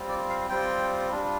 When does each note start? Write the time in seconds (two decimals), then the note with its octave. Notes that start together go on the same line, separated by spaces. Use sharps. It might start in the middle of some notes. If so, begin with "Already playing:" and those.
Already playing: G3 C4 F4
0.09 D5
0.29 F5
0.49 G3 C4 F4 G5
1.11 G3 D4 F4